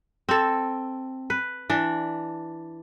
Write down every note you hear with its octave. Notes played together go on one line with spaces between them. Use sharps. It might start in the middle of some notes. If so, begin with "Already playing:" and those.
C4 A4
B4
E3 D4